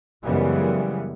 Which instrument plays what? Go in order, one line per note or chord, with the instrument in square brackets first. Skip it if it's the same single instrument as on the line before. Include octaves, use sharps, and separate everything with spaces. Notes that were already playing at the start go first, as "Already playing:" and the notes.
[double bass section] F#2 C#3 E3 G3 G#3 B3